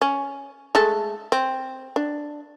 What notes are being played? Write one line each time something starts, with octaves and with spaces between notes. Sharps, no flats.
C#4
G#3 A3 A4
C4
D4